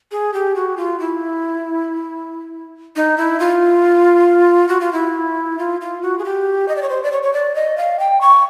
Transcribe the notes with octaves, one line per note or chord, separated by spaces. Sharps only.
G#4
G4
F#4
F4
E4
D#4
E4
F4
F#4
F4
E4
F4
F4
F#4
G#4
G4
D#5
D5
C#5
C5
D5
C#5
C#5
D5
D#5
F5
G5
C#6